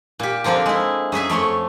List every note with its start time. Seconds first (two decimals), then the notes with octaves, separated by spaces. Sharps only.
0.19 A#2 G4
0.44 D3 F3 A#3 C4 D4
0.66 G#3 E4
1.12 F#2 G#4 E5 G#5
1.29 F2 A3 C#5 C6